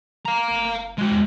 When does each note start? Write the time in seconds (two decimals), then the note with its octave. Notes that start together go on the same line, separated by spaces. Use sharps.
0.26 F5 A#5
0.50 F#1
0.98 G#3 F#4
1.11 E2